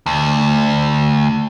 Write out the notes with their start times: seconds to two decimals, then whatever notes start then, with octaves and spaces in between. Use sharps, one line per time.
0.06 D2